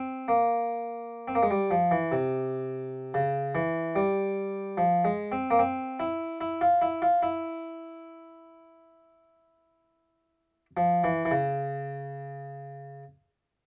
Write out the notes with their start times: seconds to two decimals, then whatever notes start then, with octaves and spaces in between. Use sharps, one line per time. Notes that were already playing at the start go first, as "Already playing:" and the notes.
Already playing: C4
0.28 A#3
1.28 C4
1.35 A#3
1.43 G#3
1.51 G3
1.71 F3
1.91 E3
2.12 C3
3.14 C#3
3.55 E3
3.96 G3
4.77 F3
5.05 G#3
5.32 C4
5.51 A#3
5.59 C4
6.00 E4
6.41 E4
6.61 F4
6.82 E4
7.02 F4
7.23 E4
10.77 F3
11.04 E3
11.25 E3
11.31 C#3